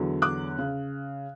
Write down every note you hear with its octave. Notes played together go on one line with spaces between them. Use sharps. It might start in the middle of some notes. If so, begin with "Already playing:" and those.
Already playing: E2 D3 F#3
D6 F#6
C#3